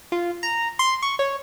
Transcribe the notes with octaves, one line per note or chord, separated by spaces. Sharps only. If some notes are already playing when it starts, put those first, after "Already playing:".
F4
A#5
C6
C#6
C#5